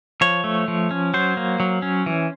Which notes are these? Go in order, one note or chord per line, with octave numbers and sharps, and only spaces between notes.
F3 C#5
A3
F3
C#4
F#3 C5
A#3
F#3
C#4
E3